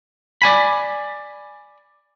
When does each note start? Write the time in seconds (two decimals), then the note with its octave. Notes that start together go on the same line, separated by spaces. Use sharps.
0.42 D5 G#5 B5